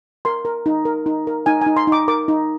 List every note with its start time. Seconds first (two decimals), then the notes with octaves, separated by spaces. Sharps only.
0.25 A#4 C6
0.45 A#4
0.66 D#4
0.85 A#4
1.06 D#4
1.27 A#4
1.46 D#4 G#5
1.61 D#4 G#5
1.77 C6
1.87 D#4 D6
2.08 A#4 D6
2.28 D#4